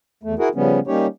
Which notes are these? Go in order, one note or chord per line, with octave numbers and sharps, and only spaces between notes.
E2 A3
E4 F#4 G#4 A#4
C#3 F3 G3 B3 C#4
G3 A#3 C#4 D#4 G4 C#5